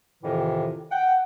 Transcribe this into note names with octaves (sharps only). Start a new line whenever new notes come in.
F2 A2 C3 D#3 E3
F#5 G5